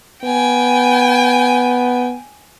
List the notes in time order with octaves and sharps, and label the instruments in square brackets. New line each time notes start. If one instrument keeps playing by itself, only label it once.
[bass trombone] B3 [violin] G5 G#5